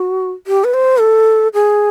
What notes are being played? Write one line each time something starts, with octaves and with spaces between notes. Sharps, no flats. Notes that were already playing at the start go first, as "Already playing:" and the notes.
Already playing: F#4
G4
B4
C5
A4
G#4